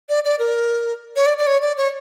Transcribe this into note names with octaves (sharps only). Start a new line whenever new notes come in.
D5
D5
A#4
C#5
D5
D5
C#5
D5
C#5